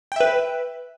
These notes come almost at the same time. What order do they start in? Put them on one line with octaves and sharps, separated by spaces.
G5 E5 B4